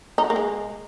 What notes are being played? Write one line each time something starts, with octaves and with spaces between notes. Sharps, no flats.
D#4
F#4
A#3
G#3